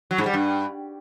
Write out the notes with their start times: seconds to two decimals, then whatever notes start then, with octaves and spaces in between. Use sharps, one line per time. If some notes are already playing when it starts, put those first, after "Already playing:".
0.11 F#3
0.18 G#2
0.26 G3
0.34 G2